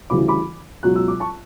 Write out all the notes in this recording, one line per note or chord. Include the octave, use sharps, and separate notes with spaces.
D2 C#3 E3 G3 B5 D6
B5 D6
C#2 B2 F#3 F#6
E6
D6
A5 C#6